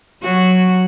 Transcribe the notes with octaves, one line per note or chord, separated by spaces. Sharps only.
F#3 F#4